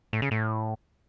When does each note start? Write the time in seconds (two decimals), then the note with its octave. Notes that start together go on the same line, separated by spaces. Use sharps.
0.13 A2
0.22 C#3
0.31 A2